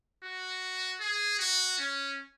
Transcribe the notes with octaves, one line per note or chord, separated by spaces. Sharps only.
F#4
G#4
F#4
C#4